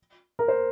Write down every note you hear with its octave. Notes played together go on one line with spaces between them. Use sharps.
A#4
C5